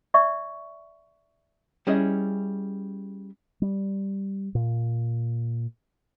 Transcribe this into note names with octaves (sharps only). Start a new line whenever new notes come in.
D5 E5 C#6
G3 C#4 E4 G#4 D#5
G3
A#2